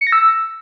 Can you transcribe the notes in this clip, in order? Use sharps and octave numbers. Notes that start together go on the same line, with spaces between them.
C#7
A#6
E6